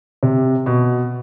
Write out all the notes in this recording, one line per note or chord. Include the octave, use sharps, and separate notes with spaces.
C3
B2